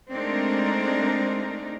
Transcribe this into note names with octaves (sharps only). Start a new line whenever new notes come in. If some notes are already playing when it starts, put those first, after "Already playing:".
G#3 A3 C4 D4 D#4 A#4